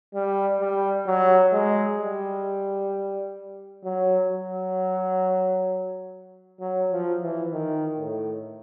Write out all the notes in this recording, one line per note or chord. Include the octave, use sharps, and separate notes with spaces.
G3
G3
F#3
G#3
G3
F#3
F#3
F#3
F3
E3
D#3
A2